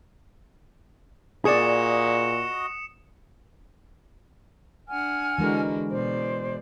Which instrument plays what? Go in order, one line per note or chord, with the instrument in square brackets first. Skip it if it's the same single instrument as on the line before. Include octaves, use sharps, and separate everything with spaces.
[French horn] A#2 [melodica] F#4 D#5 [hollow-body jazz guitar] G#4 D5 [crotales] D#6 C#7 E7
[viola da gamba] D4 [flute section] F#5 G#5 F6
[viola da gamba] D3 F#4 [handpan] E3 G#3 A#4
[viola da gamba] B2 D5 [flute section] C5